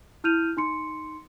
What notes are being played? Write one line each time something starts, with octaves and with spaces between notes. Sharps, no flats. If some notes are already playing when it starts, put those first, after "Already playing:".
E4 F6 G6 D#7 F7
D#4 C6 C#7